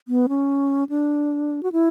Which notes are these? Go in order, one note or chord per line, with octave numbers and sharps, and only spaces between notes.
B3
C#4
D4
F#4
E4